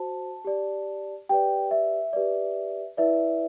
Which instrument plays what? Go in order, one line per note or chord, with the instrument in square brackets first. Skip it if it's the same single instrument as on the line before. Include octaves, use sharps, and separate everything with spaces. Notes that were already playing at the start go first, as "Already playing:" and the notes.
Already playing: [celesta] F#4 C5 A5
G4 D5
G4 B4 D5 G5
E5
G4 B4 D5
E4 B4 D5 E5